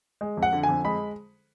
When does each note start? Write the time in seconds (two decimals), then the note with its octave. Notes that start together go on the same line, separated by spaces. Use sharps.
0.21 G#3
0.37 F2
0.43 F#5
0.53 D3
0.63 G#5
0.69 F2
0.85 G#3 B5